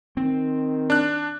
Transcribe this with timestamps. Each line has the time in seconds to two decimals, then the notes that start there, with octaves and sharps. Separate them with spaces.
0.17 D#3 C4
0.90 D4 F#6